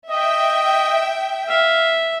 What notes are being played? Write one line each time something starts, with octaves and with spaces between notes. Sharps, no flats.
D#5 E5 G5
E5 F5